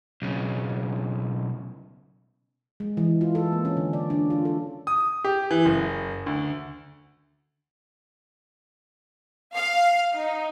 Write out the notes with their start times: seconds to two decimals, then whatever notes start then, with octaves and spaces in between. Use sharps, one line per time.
0.22 B1 C#3
2.80 G#3
2.97 E3
3.21 F4
3.35 A4
3.52 A#3
3.65 C#4
3.77 D3
3.93 D5
4.10 D4
4.30 F4
4.45 A4
4.87 D#6
5.24 G4
5.51 E3
5.65 F#1
6.26 D2
9.55 F5
10.15 D#4